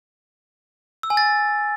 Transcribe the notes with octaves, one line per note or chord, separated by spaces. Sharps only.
E6
G#5
A6